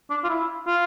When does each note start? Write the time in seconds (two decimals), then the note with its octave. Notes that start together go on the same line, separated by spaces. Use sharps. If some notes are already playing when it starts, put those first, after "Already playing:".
0.10 D4
0.24 F4
0.29 E4
0.67 F4